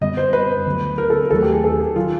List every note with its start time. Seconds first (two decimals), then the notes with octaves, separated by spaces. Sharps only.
0.01 F#2 D3 G3 B3 D#5
0.17 C5
0.33 B4
0.66 D2 D3 F#3 B3
0.98 A#4
1.10 A4
1.20 A#4
1.31 D#2 D#3 F#3 A3 A4
1.42 G4
1.52 G#4
1.64 A4
1.80 G#4
1.96 D#3 F#3 F4